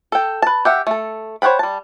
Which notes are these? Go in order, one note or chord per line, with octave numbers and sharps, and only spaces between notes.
A4 G5
B4 A5
G4 E5 F#5
A3 A4
C5 C#5 F#5 G5 B5
G3 A5